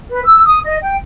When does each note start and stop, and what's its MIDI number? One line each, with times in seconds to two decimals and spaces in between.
0.09 0.20 71
0.24 0.43 88
0.45 0.59 87
0.64 0.76 75
0.81 0.95 79